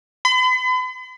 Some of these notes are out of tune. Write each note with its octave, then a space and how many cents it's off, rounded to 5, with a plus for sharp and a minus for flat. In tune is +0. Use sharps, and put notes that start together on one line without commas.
B5 +45